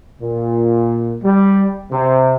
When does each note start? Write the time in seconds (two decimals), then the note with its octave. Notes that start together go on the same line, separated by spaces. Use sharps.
0.20 A#2
1.23 G3
1.91 C3